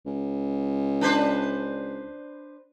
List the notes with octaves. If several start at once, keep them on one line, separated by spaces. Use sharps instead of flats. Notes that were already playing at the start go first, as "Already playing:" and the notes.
C#2
D4 B4 C5